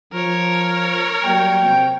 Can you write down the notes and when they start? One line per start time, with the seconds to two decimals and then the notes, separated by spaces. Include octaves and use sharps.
0.13 F3 A#4 C#5
1.24 F#3 G3 A#3 G5
1.63 C3